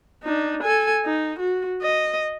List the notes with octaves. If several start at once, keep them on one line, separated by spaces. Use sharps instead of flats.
D4 D#4
A4 G#5
D#4
F#4
D#5